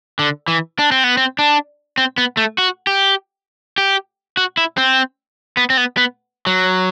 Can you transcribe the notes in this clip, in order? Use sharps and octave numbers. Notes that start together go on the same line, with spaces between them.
D3
E3
D4
C4
B3
C4
D4
C4
B3
A3
F#4
G4
G4
F#4
E4
C4
B3
C4
B3
B3
F#3